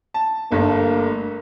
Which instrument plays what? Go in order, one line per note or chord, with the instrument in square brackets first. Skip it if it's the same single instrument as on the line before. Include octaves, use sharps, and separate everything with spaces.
[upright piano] A5
[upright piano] G1 G2 A3 [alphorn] A#3